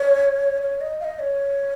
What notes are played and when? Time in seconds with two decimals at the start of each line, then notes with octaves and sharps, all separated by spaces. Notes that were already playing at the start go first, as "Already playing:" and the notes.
Already playing: C#5
0.62 C#5
0.81 D#5
1.00 F5
1.04 D#5
1.19 C#5